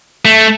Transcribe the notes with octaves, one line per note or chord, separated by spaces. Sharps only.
A3